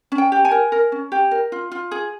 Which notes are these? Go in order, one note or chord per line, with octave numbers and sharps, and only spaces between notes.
C#4
G5
G4
G#5
A#4
A#4
C#4
G4
A#4
F4
F4
G#4